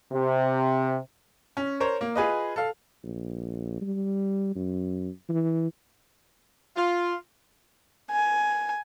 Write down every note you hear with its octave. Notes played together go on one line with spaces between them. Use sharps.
C3
C#4
A#4 C5 C#5
A#3
F4 G#4 B4 D#5
A4 F5
A#1
G3
F#2
E3
F4
G#5